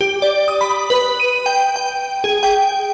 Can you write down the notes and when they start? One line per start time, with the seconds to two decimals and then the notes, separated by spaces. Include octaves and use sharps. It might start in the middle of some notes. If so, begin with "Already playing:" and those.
0.01 G4
0.22 D5
0.48 D#6
0.61 B5
0.90 B4
1.20 D#7
1.46 G5
1.76 G5
2.24 G#4
2.43 G5